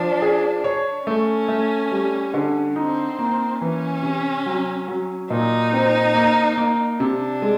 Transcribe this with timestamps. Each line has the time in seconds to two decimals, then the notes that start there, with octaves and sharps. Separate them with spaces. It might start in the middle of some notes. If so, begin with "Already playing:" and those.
Already playing: F3 D4
0.22 G#4
0.64 C#5
1.06 A3 C#4
1.48 A3
1.92 G3
2.34 D3
2.76 C4 D#4
3.19 A#3
3.60 E3 C#4
4.03 C3
4.46 F#3
4.88 F#3
5.30 A#2 D#4
5.73 C4
6.15 A#3
6.58 A#3
7.00 C3 D4
7.42 G#3